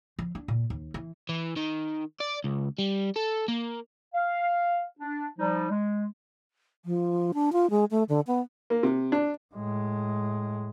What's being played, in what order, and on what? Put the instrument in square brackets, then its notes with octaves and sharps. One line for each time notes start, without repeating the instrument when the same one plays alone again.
[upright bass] F3
D4
A#2
D#2
E3
[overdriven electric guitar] E3
D#3
D5
C#2
G3
A4
A#3
[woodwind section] F5
D4
F3 G3 D#4
G#3
[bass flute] F3
D4
F4
G#3
A3
D3
B3
[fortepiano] A#3
C3
D4
[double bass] A2 G#3